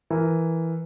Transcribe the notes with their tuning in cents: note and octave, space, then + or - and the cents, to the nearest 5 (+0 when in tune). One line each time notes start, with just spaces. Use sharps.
E3 +0 A#4 +0